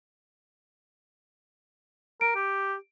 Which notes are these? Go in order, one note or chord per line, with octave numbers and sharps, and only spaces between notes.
A#4 D7
G4